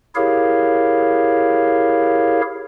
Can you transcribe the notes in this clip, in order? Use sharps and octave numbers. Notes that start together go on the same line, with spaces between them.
E4 G4 G#4 A#4 C#5 F5